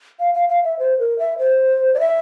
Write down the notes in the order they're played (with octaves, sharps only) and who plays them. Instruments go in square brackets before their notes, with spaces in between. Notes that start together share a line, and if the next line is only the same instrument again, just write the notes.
[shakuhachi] F5
F5
F5
E5
C5
A#4
E5
C5
D5
E5